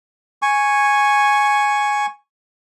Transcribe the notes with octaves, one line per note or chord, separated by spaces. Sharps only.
G#5 C#6